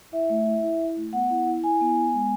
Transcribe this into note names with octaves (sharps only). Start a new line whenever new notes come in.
E4 E5
A3
E4
E4
E4
A3
B3 F#5
E4
E4
E4 G#5
B3
B3
G#3